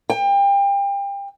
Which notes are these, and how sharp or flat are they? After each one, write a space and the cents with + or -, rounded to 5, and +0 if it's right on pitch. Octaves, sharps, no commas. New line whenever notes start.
G5 +30